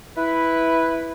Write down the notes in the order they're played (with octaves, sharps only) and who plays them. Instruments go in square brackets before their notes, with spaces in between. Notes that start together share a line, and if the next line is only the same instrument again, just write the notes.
[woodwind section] E4 B4